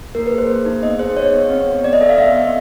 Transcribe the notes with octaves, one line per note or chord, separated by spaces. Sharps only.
A#3 A#4
B4
G#4
C5
A#3
D#4
B3 D#5
G#4 C5
B3 C#5
B3
C4
C4
C4 D5
D#5
A4 E5
F5
B3 E5
B3